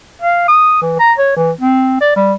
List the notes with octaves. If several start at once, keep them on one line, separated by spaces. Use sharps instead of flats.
F5
D#6
E3
A#5
C#5
E3
C4
D5
G3